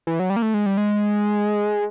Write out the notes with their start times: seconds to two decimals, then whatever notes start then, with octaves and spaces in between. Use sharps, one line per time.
0.07 E3
0.20 F#3
0.30 G3
0.36 A#3
0.42 A3
0.54 G#3
0.66 G3
0.77 G#3